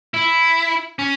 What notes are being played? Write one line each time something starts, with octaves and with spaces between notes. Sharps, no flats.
E4
C#4